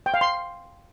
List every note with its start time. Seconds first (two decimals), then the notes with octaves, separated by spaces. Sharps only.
0.06 G5
0.14 F5
0.21 C6